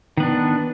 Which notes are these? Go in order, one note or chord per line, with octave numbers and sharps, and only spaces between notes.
D#3 B3 D4